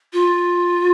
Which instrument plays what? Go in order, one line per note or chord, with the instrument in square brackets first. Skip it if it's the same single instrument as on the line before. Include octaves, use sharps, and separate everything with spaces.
[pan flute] F4